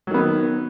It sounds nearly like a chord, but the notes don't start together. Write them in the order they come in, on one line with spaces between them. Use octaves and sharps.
F#3 D#3 B3